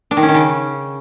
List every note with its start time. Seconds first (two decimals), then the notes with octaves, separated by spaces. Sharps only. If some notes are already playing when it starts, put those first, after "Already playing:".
0.11 D4
0.17 D#3
0.23 C#4
0.29 D#3
0.34 C#3